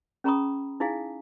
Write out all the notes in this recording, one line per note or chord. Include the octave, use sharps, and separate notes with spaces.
C#4 G#4 A#5 B5 C#6 D#6
D#4 E4 G#4 F5 G#5